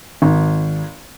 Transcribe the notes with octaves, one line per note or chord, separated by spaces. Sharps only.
G#1